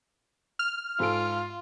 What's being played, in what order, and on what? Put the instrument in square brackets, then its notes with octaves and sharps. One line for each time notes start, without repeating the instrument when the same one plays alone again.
[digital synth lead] F6
[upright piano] G#2 A4 D7 [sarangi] F4